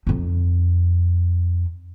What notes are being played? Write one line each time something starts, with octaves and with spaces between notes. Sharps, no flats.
F2 D#4